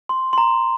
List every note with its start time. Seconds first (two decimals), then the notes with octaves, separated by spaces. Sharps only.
0.09 C6
0.33 C6
0.38 A#5